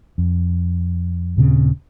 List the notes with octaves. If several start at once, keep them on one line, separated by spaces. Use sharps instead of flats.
F2
D#2 A#2 C#3 C4